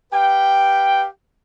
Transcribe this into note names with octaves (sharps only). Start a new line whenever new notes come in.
G4 B4 F5 G5